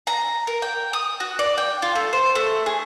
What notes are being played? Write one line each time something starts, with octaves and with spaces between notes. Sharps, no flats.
A#5
A#4
G5
D#6
F#4
D5
G5
F4
A3
C5
A3
G#4